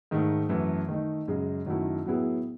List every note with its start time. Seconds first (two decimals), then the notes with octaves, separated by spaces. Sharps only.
0.11 G#2 D#3 A3
0.49 F#2 E3 A3
0.88 D#3 A3 D#4
1.28 F#2 C#3 G#3
1.66 F#2 D#3 F#3 A3 E4
2.06 A2 F#3 B3 E4 G#4